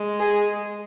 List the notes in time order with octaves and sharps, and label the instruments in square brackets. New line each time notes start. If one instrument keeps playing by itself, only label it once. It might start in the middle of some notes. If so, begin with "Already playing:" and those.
Already playing: [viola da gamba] G#3
[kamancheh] G#4